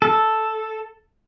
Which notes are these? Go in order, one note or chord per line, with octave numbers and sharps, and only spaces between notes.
A4